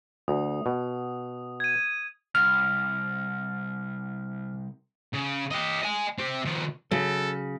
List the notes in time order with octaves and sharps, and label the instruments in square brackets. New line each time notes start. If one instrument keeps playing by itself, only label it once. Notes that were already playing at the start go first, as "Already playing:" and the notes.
[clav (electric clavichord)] D2 [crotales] D#6
[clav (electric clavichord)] B2
[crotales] G#6 D#7
[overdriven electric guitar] C2 [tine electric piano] F6
[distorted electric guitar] C#3
G4 D#5
D#5 G#5
C4 G4
D#3 F3
[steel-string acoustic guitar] C#3 [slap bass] F#3 [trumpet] A4